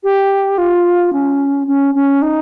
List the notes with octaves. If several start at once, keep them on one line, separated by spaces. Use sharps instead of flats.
G4
F4
C#4
C#4
C#4
D#4